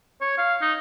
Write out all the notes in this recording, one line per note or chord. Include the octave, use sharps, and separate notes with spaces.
C#5
F5
D#4